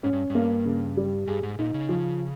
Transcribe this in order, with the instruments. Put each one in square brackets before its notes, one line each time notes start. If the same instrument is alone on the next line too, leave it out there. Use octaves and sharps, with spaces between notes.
[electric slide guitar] G#2 [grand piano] C#4
[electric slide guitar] G2
G2
[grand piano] A#3
C#3
G3
[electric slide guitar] G2 [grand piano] G#4
[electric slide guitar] G#2
[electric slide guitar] A#2 [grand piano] D#4
[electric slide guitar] C#3
[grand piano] F3